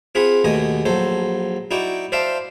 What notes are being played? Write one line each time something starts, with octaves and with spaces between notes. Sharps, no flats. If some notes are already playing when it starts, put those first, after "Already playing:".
C4 F4 G#4 F#5 B5
D#2 B2 A3 D#5 G#5
A#1 F#3 A4 C5
D#4 E4 F#4 D5 G5
C5 D5 E5 F5 G5 A5